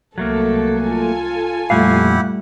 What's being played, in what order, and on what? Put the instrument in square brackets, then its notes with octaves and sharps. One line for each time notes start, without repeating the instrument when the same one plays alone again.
[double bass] C2 [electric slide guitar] F#3 A3 A#3 [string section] A4
[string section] F4 A4 G#5
[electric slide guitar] F2 A#2 F5 [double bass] G3 A3 [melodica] E4 G4 F#5